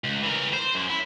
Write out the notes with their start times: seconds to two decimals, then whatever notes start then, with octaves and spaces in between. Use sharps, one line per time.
0.04 C#2
0.23 E3 A#4
0.54 C5
0.75 F#2
0.90 E4